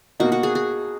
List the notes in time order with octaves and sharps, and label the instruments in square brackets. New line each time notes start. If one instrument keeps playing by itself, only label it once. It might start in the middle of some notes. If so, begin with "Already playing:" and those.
[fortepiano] B2 A#3 D#4 [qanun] F#4
[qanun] F#4
G#4
G#4